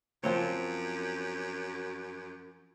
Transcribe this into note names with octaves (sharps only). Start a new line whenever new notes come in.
F#2 F3 C4 C#5